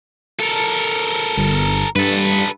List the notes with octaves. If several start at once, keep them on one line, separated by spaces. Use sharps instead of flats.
A4 A#4
G1
G2 A4 B4